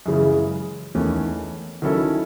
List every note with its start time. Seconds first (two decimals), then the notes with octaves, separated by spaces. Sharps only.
0.06 F#2 C#3 E3 G#3
0.95 E2 D#3 A3 C#4
1.82 D#3 F#3 C#4 E4 A4